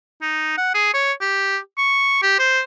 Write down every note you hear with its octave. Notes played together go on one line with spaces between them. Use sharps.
D#4
F#5
G#4
C#5
G4
C#6
G4
C5